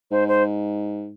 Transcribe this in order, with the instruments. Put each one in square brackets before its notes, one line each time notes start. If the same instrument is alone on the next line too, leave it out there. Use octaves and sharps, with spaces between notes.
[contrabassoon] G#2 [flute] C5
[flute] C5